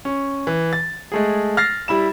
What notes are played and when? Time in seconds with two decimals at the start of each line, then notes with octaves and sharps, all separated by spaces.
0.05 C#4
0.47 E3
0.73 A6
1.12 G#3 A3 G#4
1.57 F6 A6 A#6 C7
1.88 G3 E4 B5 E7